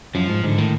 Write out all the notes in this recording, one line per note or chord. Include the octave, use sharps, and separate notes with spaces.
F#2 F3
G#2
G#2 D3
A2 D#3